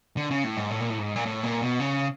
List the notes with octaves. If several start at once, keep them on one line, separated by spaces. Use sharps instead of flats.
D3
C#3
A2
G#2
A2
A#2
A2
G#2
A#2
A2
A#2
B2
C#3